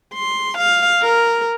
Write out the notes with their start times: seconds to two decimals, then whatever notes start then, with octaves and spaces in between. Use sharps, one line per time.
0.14 C6
0.57 F5
1.02 A#4